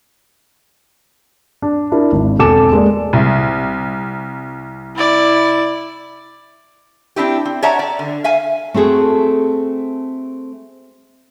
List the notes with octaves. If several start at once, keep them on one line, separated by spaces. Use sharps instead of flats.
D4
D4 E4 A#4
G#1
E1 C4 A4 G#5 D6 E7
G#3 A#3 D5
C2
E4 D5
C4 D4 E4 G4
C4
C#5 D5 E5 F#5 A5 A#5
D5
D3
E5 F5 G#5
A3 C4 F#4 G#4 A4